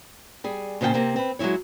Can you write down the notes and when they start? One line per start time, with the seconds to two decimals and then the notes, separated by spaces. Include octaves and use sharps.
0.44 G3 G#4
0.81 A#2 C#3 C5 F#5 G5 A5
0.94 C3 A#3 C4
1.16 C4 B4
1.39 F#3 G#3 A3 E4 C#5